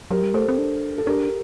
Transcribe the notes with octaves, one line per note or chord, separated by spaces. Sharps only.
F#3 G4 A#4
G3
A3 A4 C5
C4
D4
A4
D4 G4 A#4